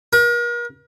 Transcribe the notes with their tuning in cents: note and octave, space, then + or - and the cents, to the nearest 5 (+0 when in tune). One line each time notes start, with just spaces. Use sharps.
A#4 +40